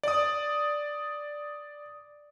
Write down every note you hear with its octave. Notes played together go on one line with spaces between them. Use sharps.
D5 D#6